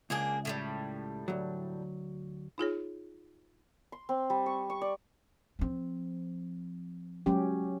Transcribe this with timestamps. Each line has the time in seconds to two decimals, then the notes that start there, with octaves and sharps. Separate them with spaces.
0.10 C#2 A#3 D4 G#4
0.45 A2 D3 G3
1.28 D2 F#3
2.58 D#4 F4 G#4 C#5
3.92 C6
4.09 C4
4.30 G3
4.46 C#6
4.70 C#6
4.81 D5
5.59 F3 C4
7.26 F#3 G#3 C#4 G4